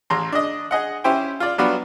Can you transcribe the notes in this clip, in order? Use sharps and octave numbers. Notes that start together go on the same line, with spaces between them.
A1 A#5 C6
D4 D#5
G#4 D#5 F#5
C#4 E4 G4 C5 G5
F4 D5
F#3 G3 B3 D4 F4 F#4